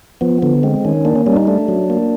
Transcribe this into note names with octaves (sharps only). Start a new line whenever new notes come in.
F3 B3
D3 B3
G#3 C4
D#3 C#4
A#3 D4
C#4
G3 C#4
D4
D#4
A3 D4
F#3
A#3